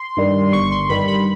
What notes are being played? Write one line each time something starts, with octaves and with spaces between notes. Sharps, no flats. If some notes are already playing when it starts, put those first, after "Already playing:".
Already playing: C6
G2 D#3 G3
G1 C#6
C6
G2 D#3 G3 B5
B5